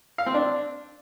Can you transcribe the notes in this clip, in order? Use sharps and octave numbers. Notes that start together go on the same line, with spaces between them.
F5
C4
D4